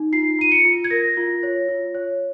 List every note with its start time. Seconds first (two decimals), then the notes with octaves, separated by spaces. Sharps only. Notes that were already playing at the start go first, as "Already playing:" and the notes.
Already playing: D#4
0.12 F4 C7
0.39 F4 D#7
0.52 C#7
0.65 F4
0.84 G#6
0.91 A#4 A#6
1.17 F4
1.43 C#5
1.68 F4
1.95 C#5